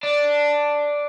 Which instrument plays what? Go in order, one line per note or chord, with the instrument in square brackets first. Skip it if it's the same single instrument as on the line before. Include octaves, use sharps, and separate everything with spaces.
[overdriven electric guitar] D4